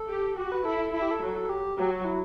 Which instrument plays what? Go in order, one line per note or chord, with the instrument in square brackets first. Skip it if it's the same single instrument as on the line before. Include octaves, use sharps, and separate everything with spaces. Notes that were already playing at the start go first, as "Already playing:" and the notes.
Already playing: [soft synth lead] A4
[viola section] G4
[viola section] F#4 [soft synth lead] G4
[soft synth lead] B4
[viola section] E4 [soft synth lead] A4
[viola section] E4 [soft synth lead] A4
[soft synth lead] G4
A4
[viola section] F#3
[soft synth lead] G4
[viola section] F#3 [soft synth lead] G4
[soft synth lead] F#4
E4